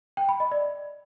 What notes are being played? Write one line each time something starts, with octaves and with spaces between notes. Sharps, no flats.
G5
B5
D#5
D5